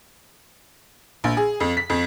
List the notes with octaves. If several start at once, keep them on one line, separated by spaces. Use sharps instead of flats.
A#1
G#4
F2
B6
F2